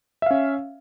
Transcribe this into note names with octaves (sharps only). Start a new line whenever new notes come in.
C#4 E5 F5